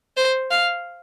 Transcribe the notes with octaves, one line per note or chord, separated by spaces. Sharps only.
C5
F5